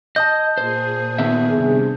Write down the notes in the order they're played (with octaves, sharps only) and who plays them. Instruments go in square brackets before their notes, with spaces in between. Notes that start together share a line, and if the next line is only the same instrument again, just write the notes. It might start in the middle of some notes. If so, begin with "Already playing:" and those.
[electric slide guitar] D#5 [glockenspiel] A5 D#6 G6
[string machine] A#2 G#4 [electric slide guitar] C5
[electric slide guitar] D#3 B3 E5
[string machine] G2 C3 [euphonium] G#4